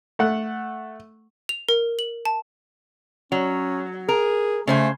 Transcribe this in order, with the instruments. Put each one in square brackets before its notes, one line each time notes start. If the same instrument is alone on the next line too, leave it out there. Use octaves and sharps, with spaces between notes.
[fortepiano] A3 F#5 F#6
[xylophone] F7
A#4
F#7
A5
[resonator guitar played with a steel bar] F#3 [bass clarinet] C#4
[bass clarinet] G#4 [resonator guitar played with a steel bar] A#4
[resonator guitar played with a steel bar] C#3 C5 G#5 [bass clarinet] A3